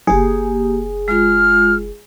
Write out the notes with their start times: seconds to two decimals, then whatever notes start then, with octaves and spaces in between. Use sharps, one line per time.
0.07 F#1 A#3 G4 G#4
1.08 G#3 F4 F6